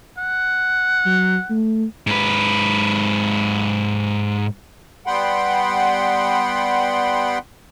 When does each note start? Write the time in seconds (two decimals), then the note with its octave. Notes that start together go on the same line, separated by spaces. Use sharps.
0.18 F#5
1.06 F#3
1.50 A3
2.07 G#2 B4
5.06 G3 B3 F#5 G5 B5 C6